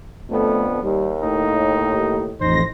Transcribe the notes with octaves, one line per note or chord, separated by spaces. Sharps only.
F2 D3 A3 B3
D#2 G3
A2 D#4
A1 F2 D#4 C5 A#6